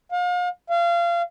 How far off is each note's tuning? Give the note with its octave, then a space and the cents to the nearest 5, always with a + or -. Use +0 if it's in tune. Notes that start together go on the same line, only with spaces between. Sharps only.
F5 +40
F5 -25